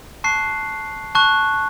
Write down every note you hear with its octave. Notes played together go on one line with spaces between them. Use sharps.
A5 C#6 F#6 C7
A5 C#6 F#6